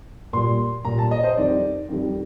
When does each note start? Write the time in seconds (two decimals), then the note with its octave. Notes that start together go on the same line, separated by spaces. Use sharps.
0.33 A#2 G3 C6
0.85 A#2 G3 A#5
0.98 A5
1.11 D#5
1.24 C5
1.37 F2 D#3 G3 D5
1.89 F2 D#3 G3